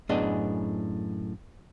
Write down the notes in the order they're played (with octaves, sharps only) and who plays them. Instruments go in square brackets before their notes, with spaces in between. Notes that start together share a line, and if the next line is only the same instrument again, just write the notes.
[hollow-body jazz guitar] F#2 A2 B3 D4 G#4 D#5